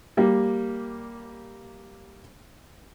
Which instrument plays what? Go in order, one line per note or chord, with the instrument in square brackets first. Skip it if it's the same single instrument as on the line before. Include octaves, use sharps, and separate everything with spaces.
[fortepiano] G3 A#3